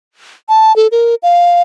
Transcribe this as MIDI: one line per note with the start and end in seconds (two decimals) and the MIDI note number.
0.49 0.75 81
0.76 0.87 69
0.92 1.15 70
1.23 1.62 77